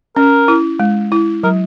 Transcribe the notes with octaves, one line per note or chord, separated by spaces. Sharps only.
C#4 A#4
E4
G#3
E4
F#3 A#4